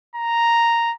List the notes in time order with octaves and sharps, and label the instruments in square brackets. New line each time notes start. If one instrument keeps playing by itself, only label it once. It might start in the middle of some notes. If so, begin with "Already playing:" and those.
[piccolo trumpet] A#5